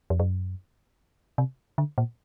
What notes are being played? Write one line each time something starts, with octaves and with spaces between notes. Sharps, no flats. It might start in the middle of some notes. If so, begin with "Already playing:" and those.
F2
F#2
C3
D3
A#2